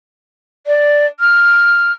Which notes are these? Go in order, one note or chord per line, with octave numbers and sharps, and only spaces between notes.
D5
F6